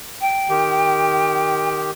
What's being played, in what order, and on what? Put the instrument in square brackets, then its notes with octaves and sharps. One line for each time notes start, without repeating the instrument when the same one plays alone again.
[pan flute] G5
[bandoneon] D#3 G4